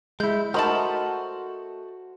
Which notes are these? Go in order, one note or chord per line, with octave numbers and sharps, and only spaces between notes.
G#3 E4 G6
A3 D#4 F#4 A#4 C5 A5 B5 F6